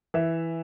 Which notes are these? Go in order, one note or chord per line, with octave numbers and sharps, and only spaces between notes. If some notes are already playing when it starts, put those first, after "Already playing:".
E3 E5